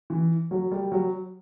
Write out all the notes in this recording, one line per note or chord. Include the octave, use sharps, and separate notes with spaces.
E3
F#3
G3
F#3